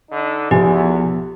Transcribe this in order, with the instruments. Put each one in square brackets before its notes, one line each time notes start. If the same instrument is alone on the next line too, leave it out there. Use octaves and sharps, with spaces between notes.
[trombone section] D3 D#4
[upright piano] B1 G#5 [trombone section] E2 [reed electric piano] F3 B3 [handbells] G4